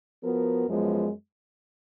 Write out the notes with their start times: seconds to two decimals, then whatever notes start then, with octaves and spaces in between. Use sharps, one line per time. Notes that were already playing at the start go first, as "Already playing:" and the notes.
0.23 F3 B3 F#4 A#4
0.67 F#2 F3 G#3 B3